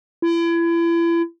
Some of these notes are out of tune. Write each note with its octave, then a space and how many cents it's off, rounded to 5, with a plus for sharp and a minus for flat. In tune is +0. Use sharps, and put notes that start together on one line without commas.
E4 +35